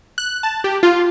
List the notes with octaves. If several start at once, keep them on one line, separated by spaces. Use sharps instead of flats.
F#6
A5
G4
F4